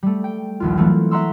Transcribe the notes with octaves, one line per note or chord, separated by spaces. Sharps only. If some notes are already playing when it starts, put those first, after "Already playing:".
G3 A3
G5
A#1 D#2 F4
E3 F#3 A3 C4 F4
E5 F#5 A#5 C6 C#6 E6